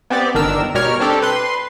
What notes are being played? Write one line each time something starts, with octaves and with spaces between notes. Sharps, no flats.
B3 C4 G4 D5
G1 D#3 D4 A#4 E6
B2 G3 A#4 C#5 F6
C4 D4 G4 A4
B4 C6